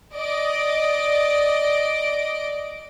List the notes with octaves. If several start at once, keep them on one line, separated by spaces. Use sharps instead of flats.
D5 D#5 D7